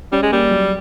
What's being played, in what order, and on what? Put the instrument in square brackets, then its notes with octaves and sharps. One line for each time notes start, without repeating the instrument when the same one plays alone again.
[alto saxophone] G3 [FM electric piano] C#4
[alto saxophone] G#3
[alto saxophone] G3 [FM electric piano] A#3
[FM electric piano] F#3